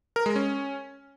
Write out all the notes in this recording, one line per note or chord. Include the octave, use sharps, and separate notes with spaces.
A#4
G#3
C#4